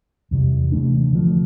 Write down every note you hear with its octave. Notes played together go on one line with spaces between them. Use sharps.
E2 C3 E3 G3
C3 E3 A3 D4
D3 F3 A3